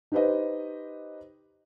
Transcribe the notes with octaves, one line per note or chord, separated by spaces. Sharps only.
D#4 G4 B4 C5 D#5